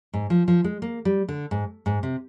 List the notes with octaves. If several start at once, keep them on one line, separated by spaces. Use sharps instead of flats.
G#2
F3
F3
G#3
A#3
G3
D3
G#2
G#2
C3